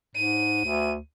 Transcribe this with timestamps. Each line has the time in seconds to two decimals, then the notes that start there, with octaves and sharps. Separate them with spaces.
0.16 G#2 D#7
0.65 D2